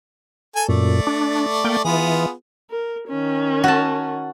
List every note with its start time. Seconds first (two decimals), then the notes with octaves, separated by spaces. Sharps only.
0.56 A4 G#5
0.69 F#2 A#2 A3 D5
1.07 D4
1.64 A#3 G5
1.85 E3 B3 F4 G#4
2.70 A#4
3.08 D#3 C#4
3.64 F#4 A5